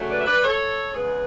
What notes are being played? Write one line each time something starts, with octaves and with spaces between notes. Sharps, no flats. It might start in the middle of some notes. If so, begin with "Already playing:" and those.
Already playing: C#3 F#3 A3
B4 D5
E5
B4 D5
A4 C#5
E2 C#3 G#3 B3 G#4 B4